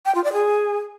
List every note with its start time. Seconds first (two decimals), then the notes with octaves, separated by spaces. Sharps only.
0.06 G5
0.15 F4
0.24 D5
0.33 G#4